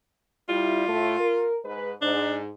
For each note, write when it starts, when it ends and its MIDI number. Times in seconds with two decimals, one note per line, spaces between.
0.49 0.88 55
0.49 0.88 64
0.49 1.49 65
0.88 1.18 45
0.88 1.18 57
1.20 1.57 70
1.64 1.92 44
1.64 1.92 71
2.02 2.48 44
2.02 2.40 62